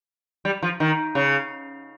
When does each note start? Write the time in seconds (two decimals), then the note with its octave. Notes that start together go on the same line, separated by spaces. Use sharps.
0.45 G3
0.62 F3
0.80 D#3
1.15 C#3